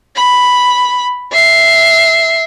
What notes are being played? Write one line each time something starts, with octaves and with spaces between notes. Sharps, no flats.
B5
E5 C7